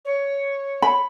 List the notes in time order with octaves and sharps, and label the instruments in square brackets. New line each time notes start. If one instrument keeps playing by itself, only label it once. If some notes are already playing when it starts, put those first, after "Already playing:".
[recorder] C#5
[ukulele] B5